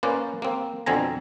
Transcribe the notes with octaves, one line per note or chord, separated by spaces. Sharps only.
A#3 C#4 B4 C5 D5
A#3 C4
F2 B2 D3 C4 G#5 A#5